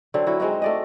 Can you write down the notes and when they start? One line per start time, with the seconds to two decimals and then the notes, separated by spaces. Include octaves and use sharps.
0.14 D3 F#3 C4
0.27 F#3 E4 F#4
0.40 G#3 C4 D#4 F#4
0.62 A3 D5 D#5